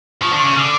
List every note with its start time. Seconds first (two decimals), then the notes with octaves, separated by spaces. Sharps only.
0.22 F3 C#6
0.32 D3
0.38 C#6
0.44 C#3
0.55 D3 D6 F6